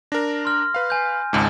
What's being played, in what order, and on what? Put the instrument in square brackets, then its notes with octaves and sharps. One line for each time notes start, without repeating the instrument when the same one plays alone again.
[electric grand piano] D4 A#4 [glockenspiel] A#6
[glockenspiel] C6 F6
[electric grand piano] B4 F5
[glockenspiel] G#5 G6
[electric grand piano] G#1 C#2 G#2 [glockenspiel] A5